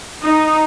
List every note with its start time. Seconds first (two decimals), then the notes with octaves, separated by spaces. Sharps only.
0.22 D#4